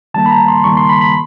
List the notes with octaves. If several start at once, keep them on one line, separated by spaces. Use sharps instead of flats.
D#3 G3 A#3 A5
B5
A#5
C6
D#3 G3 A#3 C#6
C6
B5
B5